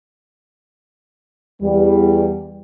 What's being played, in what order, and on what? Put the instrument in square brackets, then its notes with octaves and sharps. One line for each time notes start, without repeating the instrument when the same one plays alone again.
[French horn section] E2 G3